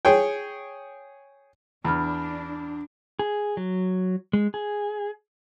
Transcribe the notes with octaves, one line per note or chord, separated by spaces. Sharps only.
G#4 C#5 G5
E2 D4 B5 F6
G#4
F#3
G#3
G#4